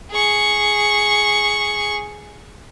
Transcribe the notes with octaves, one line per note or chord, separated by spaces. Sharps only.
G#4 C#6